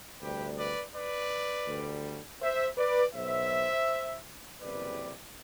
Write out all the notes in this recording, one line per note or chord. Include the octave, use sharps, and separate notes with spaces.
D2 C3 G3 G4 B4
B4 D5
B4 D5
D2 D3 G3
C5 E5
B4 D5
B1 B2 F#3 C5 E5
F#1 E2 C3 E3 G3 B4 D5